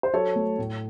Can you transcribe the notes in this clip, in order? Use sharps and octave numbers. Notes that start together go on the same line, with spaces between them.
C5
F#3 A4 C#5
A3
A2